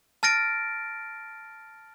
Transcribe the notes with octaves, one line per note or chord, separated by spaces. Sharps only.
A5 F6 A6 A#6 D7